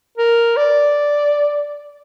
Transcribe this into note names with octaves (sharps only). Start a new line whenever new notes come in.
A#4
D5